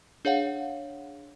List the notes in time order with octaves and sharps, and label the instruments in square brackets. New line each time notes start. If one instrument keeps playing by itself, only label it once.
[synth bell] D4 G#4 C#5 F5 F#5